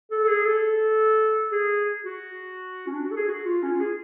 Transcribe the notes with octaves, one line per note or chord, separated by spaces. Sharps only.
A4
A4
G#4
A4
G#4
F#4
C#4
D4
F#4
A4
G#4
F#4
F4
C#4
F4
G#4